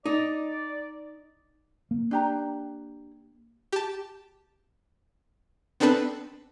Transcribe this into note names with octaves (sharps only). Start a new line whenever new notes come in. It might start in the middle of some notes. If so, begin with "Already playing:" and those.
D#4 D5
A#3
D4 G4 A#5
G4 A5
B3 C4 D4 A4 B4